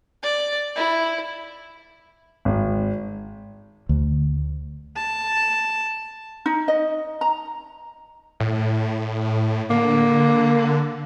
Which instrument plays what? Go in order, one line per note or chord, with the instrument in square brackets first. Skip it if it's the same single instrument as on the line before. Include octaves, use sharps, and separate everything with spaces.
[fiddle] D5
E4
[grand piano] G#1
[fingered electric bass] D2
[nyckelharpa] A5
[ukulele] D#4
D#5
A#5
[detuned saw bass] A2
[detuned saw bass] D3 [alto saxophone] A#3